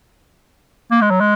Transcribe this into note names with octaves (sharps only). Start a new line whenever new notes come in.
A#3
G#3
F#3
G#3